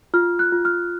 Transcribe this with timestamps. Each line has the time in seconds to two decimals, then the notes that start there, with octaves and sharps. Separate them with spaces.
0.14 F4 F6
0.39 F#6
0.52 F4
0.65 F6